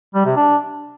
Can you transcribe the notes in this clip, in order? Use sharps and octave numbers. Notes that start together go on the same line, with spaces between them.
G3
C3
D4